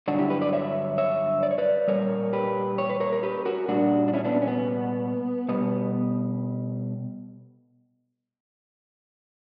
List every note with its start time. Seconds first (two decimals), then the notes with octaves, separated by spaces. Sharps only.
0.08 G2 D3 F#3 D4 F#4
0.19 E4 G4
0.30 G4 B4
0.41 B4 D5
0.53 C#5 E5
0.98 C#5 E5
1.43 D5
1.51 C#5
1.58 B4 D5
1.88 A#2 G3 A#4 C#5
2.33 G4 B4
2.78 C#5
2.90 B4
3.00 A#4 C#5
3.13 A#4
3.23 G4 B4
3.45 F#4 A#4
3.68 A#2 G3 D4 F#4
4.08 D4
4.13 C#4 E4
4.25 B3 D4
4.42 C#4
4.47 B3
5.49 B2 G3 B3